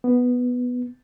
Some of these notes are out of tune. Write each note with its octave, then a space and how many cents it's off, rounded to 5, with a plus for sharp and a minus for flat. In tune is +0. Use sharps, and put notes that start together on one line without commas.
B3 +0